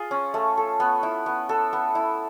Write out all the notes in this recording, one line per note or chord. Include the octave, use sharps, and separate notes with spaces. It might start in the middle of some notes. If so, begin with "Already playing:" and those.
Already playing: F4 G#4
C#4
A3
A4
B3
E4
B3
A4
B3
E4